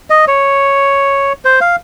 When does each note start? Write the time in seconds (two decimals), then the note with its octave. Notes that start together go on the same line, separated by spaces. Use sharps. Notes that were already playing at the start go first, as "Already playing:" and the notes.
0.10 D#5
0.28 C#5
1.45 C5
1.61 F5